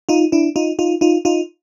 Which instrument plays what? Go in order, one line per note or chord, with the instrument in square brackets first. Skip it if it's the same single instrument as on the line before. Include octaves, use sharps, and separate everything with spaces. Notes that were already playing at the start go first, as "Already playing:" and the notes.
[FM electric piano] D#4 F4
D4 E4
D#4 F4
D#4 F4
D#4 F4
D#4 F4